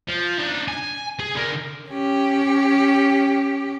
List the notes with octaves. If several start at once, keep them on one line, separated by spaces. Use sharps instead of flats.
F3
D4 D#4
G#5
G#4
D3 A#4
C#4 G4